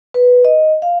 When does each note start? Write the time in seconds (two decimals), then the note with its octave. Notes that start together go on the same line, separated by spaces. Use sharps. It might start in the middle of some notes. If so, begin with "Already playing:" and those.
0.14 B4
0.45 D#5
0.82 F5